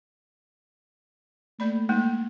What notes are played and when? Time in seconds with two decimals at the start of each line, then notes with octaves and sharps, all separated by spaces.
1.60 A3 A#3 D5 B5
1.89 G#3 A#3 D#4